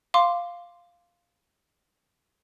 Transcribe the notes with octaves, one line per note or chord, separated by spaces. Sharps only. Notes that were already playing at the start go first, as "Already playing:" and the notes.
F5 C6 D6